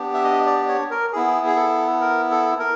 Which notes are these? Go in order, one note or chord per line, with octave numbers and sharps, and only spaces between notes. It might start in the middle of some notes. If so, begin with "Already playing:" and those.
Already playing: B3 D4 G4
E5
D#5
D5
C#5
A#4
B3 E4 G#4
G#4
A4
A#4
A4
A#4